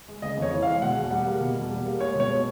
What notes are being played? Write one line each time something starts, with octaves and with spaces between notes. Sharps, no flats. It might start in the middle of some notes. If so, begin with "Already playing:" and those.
G#3
C#3 D#5
F2 C#5
E3
G#3 F5
B2 F#5
E2
G3 F#5
A#3
B2
E2
G3
A#3
G#3 C#5
B2 C#5
B3